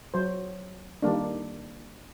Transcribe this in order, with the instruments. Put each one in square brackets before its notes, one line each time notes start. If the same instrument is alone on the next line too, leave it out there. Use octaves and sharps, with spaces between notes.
[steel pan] F#3 C5
D#3 G3 A#3 D4